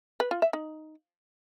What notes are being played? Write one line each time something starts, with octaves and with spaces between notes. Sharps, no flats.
B4
F4
E5
D#4